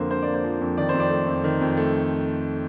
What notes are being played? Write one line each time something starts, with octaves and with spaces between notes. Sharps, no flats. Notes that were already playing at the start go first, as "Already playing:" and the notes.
Already playing: F2 D3 F3 A#3 C5
D3 C5
A#3 D5
C5
F3
F2
D#3 D5
F2 C5
D5
A3
F2
D#3
F2
A3